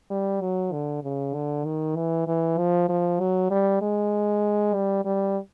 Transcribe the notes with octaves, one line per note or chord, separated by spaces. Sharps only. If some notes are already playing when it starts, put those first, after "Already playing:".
G3
F#3
D3
C#3
D3
D#3
E3
E3
F3
F3
F#3
G3
G#3
G3
G3